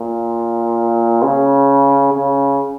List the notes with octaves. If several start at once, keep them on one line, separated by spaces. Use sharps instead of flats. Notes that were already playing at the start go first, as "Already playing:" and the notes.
Already playing: A#2
C#3
C#3